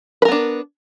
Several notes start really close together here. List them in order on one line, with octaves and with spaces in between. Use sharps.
B4 A#4 B3 D4